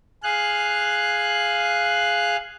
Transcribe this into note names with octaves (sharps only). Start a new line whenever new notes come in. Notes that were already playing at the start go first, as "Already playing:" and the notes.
G#4 F5 F#6